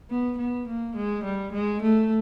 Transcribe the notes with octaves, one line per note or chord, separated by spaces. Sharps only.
B3
B3
A#3
G#3
G3
G#3
A3